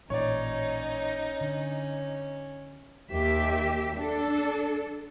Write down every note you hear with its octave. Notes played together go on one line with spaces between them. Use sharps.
A1 A#2 C#4 D#4 C#5 D5
D3
D#2 G4 E5
D4 A4